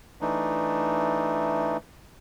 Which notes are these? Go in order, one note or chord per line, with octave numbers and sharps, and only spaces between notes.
E3 A3 D4 D#4